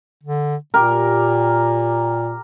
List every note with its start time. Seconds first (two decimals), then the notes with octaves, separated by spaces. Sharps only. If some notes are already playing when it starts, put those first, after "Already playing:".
0.23 D3
0.74 A#2 G4 A#4